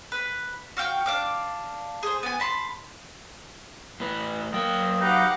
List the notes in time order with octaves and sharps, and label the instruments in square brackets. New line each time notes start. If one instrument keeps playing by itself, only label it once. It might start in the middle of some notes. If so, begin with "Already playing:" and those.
[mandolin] B4
F#4 F5 G5
D4 F5 D6
G#4 C5
B3 G#5
A5 B5 C6
[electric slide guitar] A2 B4
[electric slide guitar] F#2 G5 [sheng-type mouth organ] A#3 E6 G6 [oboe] D#5
[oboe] D#4 [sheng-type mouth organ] G4 B4 A#5 [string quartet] F5 F#5 D6